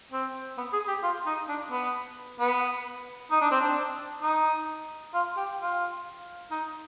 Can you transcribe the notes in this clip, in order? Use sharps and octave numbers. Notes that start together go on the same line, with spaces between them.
C4
B3
G#4
G4
F4
D#4
D4
B3
B3
D#4
D4
C4
D4
D#4
F4
G4
F4
D#4